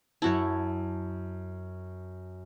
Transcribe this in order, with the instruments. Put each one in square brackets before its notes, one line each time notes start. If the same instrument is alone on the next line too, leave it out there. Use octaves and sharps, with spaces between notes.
[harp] F#2 A5 [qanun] E4 F#4 C#5